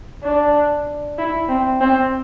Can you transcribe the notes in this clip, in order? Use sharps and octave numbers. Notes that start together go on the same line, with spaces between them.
D4
E4
C4
C4